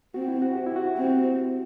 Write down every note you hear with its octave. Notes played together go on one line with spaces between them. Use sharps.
C4 F#4
E4
F#4
G4
E4
F#4
C4